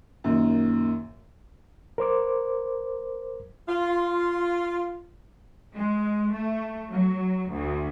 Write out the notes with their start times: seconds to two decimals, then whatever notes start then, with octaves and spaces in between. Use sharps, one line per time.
0.24 F#2 A#2 D#3
1.98 A#4 C5 D6
3.68 F4
5.75 G#3
6.34 A3
6.90 F#3
7.51 D2